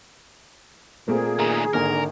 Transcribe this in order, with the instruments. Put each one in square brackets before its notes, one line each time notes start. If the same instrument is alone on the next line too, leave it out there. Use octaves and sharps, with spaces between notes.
[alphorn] A#2 [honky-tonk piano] A3 A#3 C4 [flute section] G#4
[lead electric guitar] D#3 A3 [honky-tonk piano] A#5
[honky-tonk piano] G#1 A#3 G#5 [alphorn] D3 [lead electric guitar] A#4